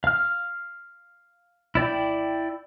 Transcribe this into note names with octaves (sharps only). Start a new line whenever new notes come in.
F5 F6
E4 D5 G5